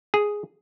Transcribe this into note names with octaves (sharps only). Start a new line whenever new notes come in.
G#4